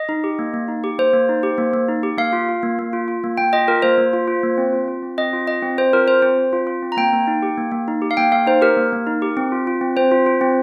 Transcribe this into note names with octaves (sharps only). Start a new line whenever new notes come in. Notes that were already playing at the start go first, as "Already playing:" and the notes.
Already playing: D#5
D#4
G4
A#3
A#3
D#4
G4
A#3 C5
A#3
D#4
G4
A#3
A#3
D#4
G4
A#3 F5
F4
F4
A#3
A#3
F4
F4
A#3
A#3 G5
F4 D#5
F4 A#4
A#3 C5
A#3
F4
F4
A#3
C4
F4
F4
C4
C4 D#5
F4
F4 D#5
C4
C4 C5
F4 A#4
F4 C5
C4 C5
C4
F4
F4
C4
A#5
A#3 G5
A#3
D#4
G4
A#3
A#3
D#4
G4
F5
A#3 G5
A#3 F5
D#4 C5
G4 A#4
A#3
A#3
D#4
G4
C4
F4
F4
C4
C4 C5
F4
F4
C4